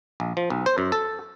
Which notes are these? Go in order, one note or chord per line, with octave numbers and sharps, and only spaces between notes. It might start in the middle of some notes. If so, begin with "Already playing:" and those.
A#1
F3
B1
C5
F#2
A4